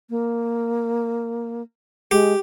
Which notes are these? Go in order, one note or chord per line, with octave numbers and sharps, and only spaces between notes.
A#3
G#3 G4